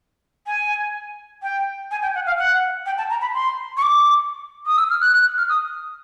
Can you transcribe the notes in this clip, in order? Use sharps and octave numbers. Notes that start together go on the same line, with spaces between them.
G#5
G5
G#5
G5
F#5
F5
F#5
G5
A5
A#5
B5
C6
C#6
D6
D#6
E6
F6
F#6
F#6
F6
D#6